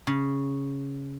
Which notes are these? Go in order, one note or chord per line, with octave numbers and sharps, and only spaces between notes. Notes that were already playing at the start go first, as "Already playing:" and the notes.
C#3